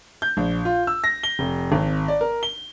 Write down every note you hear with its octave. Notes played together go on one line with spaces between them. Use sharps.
G6
A#1
F4
E6
A#6
G7
F1
G#1
D5
A#4
G7